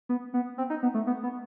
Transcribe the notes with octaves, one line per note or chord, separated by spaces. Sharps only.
B3
B3
C4
D#4
B3
A3
B3
B3